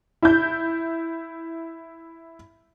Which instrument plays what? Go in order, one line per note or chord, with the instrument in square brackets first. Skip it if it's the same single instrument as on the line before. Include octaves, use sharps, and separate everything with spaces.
[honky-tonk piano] E4 G6